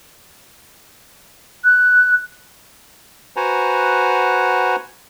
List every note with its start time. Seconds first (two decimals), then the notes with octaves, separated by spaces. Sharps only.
1.64 F#6
3.36 F#4 B4 C5 F#5 G#5 A#5